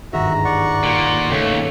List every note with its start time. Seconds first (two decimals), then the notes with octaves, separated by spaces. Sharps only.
0.13 G1 D#2 G#2 F#4 E5 A#5
0.45 D5 F#5 C#6
0.83 A#2
1.30 D#2 C#3 A3 C#5 G5